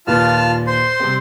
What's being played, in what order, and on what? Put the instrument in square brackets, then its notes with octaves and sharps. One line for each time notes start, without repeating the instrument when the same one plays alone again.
[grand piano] D#2 A#2 B4 [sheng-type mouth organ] F4 A5 F6
[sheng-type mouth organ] C5 C6
[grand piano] C3 G3 C4